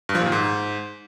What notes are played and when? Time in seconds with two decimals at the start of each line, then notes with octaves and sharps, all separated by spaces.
0.09 G2
0.15 F3
0.21 A#2
0.26 D#3
0.32 G#2